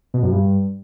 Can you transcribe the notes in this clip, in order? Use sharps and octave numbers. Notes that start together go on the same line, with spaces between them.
B2
F#2
G2